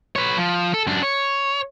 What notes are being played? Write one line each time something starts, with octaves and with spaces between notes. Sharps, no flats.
B4 C#5
F3
A4
F#2 D4
C#5